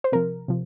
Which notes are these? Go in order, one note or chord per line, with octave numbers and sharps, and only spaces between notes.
C5
C3 F3 A#4
C3 F3